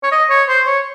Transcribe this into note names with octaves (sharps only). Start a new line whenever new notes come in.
C#5
D#5
C#5
C5
C#5